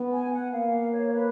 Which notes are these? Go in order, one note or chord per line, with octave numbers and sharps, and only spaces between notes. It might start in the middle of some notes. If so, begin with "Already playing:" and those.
Already playing: B3
G#5
F#5
A#3 F5
C#5
B4